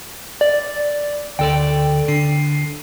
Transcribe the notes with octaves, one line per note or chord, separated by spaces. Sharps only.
D5
D2 A4 D5 G5
D3 C7